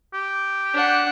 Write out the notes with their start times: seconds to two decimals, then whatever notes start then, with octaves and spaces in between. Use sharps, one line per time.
0.14 G4
0.74 D4 F#5